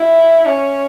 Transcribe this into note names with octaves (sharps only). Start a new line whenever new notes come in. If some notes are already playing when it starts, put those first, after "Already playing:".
Already playing: E4
C#4